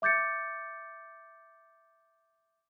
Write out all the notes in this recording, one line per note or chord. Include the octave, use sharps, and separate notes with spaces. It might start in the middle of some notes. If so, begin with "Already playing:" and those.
E5 D6 G6 A6 C#7